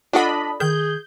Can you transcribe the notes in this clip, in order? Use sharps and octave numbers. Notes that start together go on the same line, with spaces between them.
D4 F4 A4 D#5 F#5 B5
D#3 G#4 G6